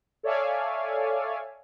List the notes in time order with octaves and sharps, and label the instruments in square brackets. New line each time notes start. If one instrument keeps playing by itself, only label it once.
[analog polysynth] A4 C#5 D5 E5 F5 G#5